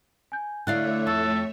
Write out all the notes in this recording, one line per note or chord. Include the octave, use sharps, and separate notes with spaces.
G#5 G6
D3 A3 E4 C#5 D5 E5 F5 F#6
F2 A4